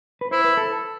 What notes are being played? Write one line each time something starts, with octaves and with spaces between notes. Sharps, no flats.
B4
E4 C5
B4
A4